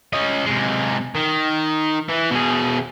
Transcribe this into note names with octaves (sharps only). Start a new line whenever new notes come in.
C#4 D#5
C3 G#3
D#3
E3
B2 G#4